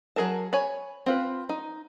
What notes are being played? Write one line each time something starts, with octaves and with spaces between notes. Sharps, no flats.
F#3 D#4 G#4 A#4 A5
C#5 G#5 B5
C4 F4 B4
D#4